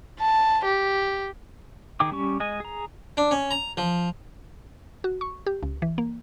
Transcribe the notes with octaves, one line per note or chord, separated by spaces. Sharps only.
A5
G4
D#3 D#4 G#4 G5 D6
G3 C#4 G4 C#6
G#3 D#5 G#5
G#4 A#5
D4
C#4
A#5
F3
F#4
C#6
G4
C#2
E3
A#3